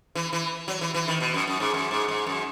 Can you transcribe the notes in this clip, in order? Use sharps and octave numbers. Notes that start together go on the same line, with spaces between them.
E3
E3
F#3
E3
E3
D#3
B2
F#2
F#2
G#2
F#2
G#2
G#2
F#2